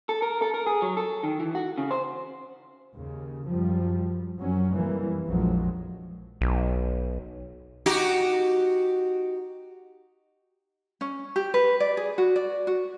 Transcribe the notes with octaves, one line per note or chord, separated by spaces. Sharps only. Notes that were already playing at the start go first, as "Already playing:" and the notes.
A4
A#4
A4
A#4
G#4
F#3
A4
D#3
E3
F#4
C#3
C5
D#2 C#3
F#2 F3 G3
F#2 F#3 C#4
C2 F2 E3 G3 A#3
A#1 F2 F3 F#3 G#3
B1
D#4 F#4 G4
C#4
G4
B4
D5
G#4
F#4
D5
F#4